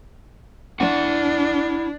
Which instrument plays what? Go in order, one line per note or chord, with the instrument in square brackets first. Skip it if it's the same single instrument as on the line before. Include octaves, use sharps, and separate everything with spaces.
[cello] D4 [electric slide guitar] E4 F#5